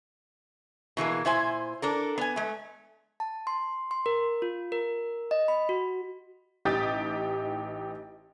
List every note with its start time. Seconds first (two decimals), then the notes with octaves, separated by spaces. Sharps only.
0.97 B2 E3 G#3 A#3
1.25 A#2 E4 C5 G#5
1.82 D4 A4 A#4
2.18 B3 G#5
2.36 G#3 A3
3.20 A5
3.47 C6
3.91 C6
4.06 A#4
4.42 F4
4.72 A#4
5.31 D#5
5.48 B5
5.69 F#4
6.65 A1 D#4 G4 G5 D#6 A6